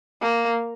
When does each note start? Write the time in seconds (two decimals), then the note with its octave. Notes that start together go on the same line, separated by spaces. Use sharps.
0.21 A#3